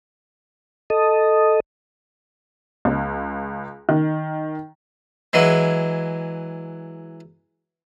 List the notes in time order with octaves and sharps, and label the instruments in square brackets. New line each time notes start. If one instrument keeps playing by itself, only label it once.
[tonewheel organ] A4 D#5
[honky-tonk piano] C#2
D#3
[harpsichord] E3 F#3 G#3